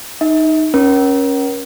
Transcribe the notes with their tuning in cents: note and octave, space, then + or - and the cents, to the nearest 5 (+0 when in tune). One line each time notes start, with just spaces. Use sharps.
D#4 +0 E5 -40
C#4 -5 A#4 +35